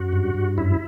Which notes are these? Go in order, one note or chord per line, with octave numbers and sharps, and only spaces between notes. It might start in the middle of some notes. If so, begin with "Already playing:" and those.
Already playing: F#2 F#4
G2
G2
F#2 E4